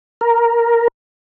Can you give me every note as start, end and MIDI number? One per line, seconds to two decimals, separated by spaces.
0.21 0.88 70